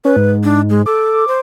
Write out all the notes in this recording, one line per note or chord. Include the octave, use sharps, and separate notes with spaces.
C#4 B4
G#2
D4
G#3
A4 D6
C5